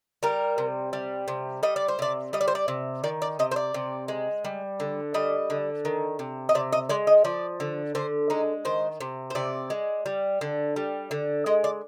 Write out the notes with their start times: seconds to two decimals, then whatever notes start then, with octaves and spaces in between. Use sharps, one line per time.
0.23 G3 A#4
0.58 C3
0.93 G3
1.28 C3
1.63 G3 D#5
1.76 D5
1.88 C5
1.99 C3 D5
2.33 G3 D#5
2.41 D5
2.48 C5
2.55 D5
2.68 C3
3.04 D#3 D5
3.22 D5
3.39 C3 D#5
3.51 C5
3.56 D5
3.74 C3
4.08 G#3
4.45 G3
4.80 D3
5.14 G3 D#5
5.50 D3
5.85 D#3
6.19 C3
6.49 D#5
6.55 C3 D5
6.72 D#5
6.89 G#3 D5
7.07 D#5
7.25 F3 D5
7.60 D3
7.95 D3 C5
8.30 G#3 D#4
8.65 D#3 C5
9.01 C3
9.30 C5
9.35 C3 D5
9.70 G#3
10.06 G3
10.41 D3
10.76 G3
11.11 D3
11.46 G#3 D#5
11.64 D5